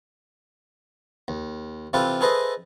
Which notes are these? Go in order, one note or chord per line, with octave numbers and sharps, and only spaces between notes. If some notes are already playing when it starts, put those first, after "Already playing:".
D#2
C3 E3 F4 G4 A4 B4
G#4 A4 B4 C5 D#5 E5